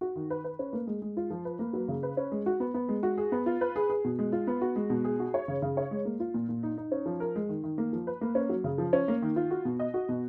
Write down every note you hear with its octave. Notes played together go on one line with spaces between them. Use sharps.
F#4
D#3
B4
B4
C#4
A#3
G#3
G#3
F4
F3
B4
A#3
F#3
C#3
B4
C#4
G#3
F#4
B3
B3
G#3
F#4
G#4
B3
F4
B4
G#4
G#4
B2
G#3
F4
B3
F#4
G#3
B2
G#4
F#4
C#5
C#3
C#3
C#5
G#3
A#3
F4
A#2
A#2
D#4
D#4
C#4
F3
A#4
G#3
D#3
D#3
A#3
F3
B4
A#3
C#4
F#3
C#3
F3
C#4
A#3
D#3
F4
F#4
B2
D#5
F#4
B2